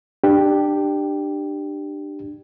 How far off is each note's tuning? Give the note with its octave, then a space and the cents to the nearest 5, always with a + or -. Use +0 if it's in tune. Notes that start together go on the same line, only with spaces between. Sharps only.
D4 +25 G4 +0